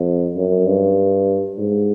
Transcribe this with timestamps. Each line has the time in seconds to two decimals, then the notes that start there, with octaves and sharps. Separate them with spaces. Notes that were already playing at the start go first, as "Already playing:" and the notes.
Already playing: F2
0.36 F#2
0.66 G2
1.58 G#2